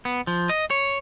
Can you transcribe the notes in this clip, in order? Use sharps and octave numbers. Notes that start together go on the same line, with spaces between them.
B3
F3
D#5
C#5